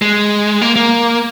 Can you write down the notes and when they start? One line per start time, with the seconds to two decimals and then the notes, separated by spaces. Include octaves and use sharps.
0.02 G#3
0.62 A#3
0.76 A#3